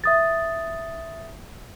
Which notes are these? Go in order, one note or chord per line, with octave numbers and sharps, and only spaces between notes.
E5 D#6 A6